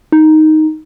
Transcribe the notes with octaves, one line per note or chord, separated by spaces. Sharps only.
D#4